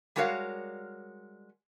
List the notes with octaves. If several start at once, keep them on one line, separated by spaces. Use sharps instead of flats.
G3 G#3 F#4 A#4 C#5 F5